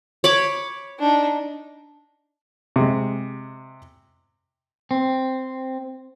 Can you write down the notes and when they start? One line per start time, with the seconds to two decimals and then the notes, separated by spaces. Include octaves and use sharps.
0.24 C#5 B5 D6
0.99 D4 D#4
2.76 C3 G#3
4.91 C4